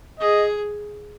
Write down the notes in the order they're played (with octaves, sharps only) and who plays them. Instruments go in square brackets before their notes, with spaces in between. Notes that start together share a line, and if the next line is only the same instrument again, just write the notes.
[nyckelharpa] G#4 [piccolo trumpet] D#5